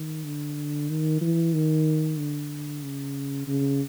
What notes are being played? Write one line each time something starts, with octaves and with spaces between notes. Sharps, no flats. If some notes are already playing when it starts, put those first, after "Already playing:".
Already playing: D#3
D3
D#3
E3
D#3
D3
C#3
C#3